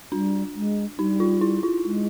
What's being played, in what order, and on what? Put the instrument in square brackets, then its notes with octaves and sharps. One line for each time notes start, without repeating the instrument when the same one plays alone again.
[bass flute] G3 [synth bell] D4
[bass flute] G#3
[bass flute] G3 [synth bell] D#4
[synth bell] F4
E4
F4
[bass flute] G#3